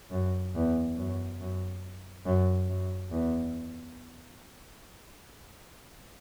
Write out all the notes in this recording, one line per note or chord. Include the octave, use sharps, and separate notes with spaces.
F#2
E2
F#2
F#2
F#2
F#2
E2